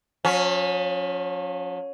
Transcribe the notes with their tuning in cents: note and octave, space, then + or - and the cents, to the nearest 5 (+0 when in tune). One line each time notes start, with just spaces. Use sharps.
F3 +45 C#4 +0